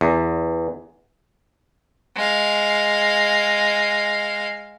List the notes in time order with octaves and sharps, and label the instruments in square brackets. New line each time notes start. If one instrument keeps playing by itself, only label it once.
[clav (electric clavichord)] E2
[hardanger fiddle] G#3 F5